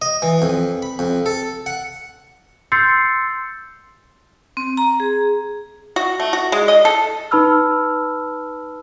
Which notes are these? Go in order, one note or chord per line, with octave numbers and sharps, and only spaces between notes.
D#5
E3
F2
B5
F2
A4
F#5
C6 E6 G6 A6 C7 C#7
C4
A#5
G#4
F#4
A3
F#4
G#3
D#5
A4
D#4 B4 A5 B5 E6 F6